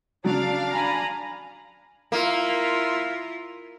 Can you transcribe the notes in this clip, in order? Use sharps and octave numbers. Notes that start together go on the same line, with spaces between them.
C#3 F#3 D4 D5 F5
G#5 A#5 B5
A#3 E4 F4